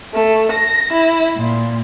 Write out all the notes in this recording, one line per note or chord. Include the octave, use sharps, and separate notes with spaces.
A3
A#6
E4
A#2